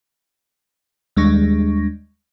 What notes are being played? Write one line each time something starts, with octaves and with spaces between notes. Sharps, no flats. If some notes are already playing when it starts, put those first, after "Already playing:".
D#2 G3 G#3 D4 C#6 A#6